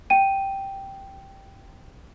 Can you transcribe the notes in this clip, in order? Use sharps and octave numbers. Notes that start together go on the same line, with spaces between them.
G5 D#7